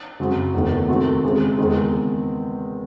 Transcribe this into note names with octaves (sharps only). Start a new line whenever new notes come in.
F#2 C#3 F#3 C4 F#4
E2 D#3 A3
C3 D#3 A3 C4 F#4
C#3 G#3 C4
E2 D#3 G#3 C4